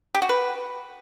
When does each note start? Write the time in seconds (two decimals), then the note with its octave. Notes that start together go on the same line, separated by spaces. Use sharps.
0.14 G4
0.22 F#4
0.29 B4